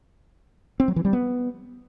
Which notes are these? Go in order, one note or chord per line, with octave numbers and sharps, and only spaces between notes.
C4
F#3
E3
G3
B3